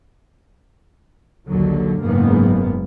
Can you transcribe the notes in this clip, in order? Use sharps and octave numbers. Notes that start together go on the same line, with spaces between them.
A#1 D#2 D3 F#3
F#1 G#2 A#3 B3